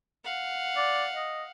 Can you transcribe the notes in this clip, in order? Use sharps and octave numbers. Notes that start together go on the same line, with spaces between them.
F5 F#5
D5
D#5